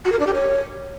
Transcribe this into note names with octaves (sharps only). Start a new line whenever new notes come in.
F#4
A#4
D4
G4
C#5